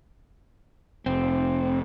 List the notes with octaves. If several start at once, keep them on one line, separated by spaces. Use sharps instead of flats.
F1 C4